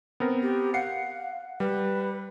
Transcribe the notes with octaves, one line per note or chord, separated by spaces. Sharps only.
B3 C4 A#4
G4
F5 F#5 C7 C#7
G3 B4